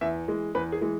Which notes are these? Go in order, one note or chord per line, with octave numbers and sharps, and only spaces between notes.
E2 E5
E3 G#3
E2 B4
G#4
E3 G#3